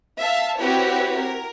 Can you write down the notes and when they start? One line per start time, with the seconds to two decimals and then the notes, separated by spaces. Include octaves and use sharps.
0.20 E5 F5 A5
0.58 C4 E4 F#4 G4 B4 C#5
1.19 A#4